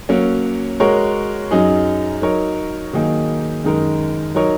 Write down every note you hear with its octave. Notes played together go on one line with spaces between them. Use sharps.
F#3 A#3 C#4
G#3 F#4 A#4 C#5
F#2 F#3 D#4 G#4
F#3 D#4 A#4 C#5
D#3 F#3 A#3 D#4 G#4
F#2 D#3 G#3 D#4 A#4
F#3 D#4 A#4 C#5